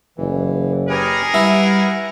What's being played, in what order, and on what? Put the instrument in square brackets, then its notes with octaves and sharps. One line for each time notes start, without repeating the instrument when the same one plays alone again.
[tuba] F#1 [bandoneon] E3
[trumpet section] D#4 G#4 A#4 [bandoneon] G4 B4 G#5
[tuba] G3 [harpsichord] E4 [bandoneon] B4 F#5